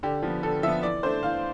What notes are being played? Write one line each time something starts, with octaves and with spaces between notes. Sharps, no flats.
D3 G4
F3 B3
D3 A4
F3 B3 E5
E3 D5
A3 D4 C5
E3 F5